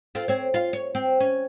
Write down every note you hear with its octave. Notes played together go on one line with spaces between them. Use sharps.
C4 F4 A4
C4 C#5
F4 F5
C#5
C4
C#4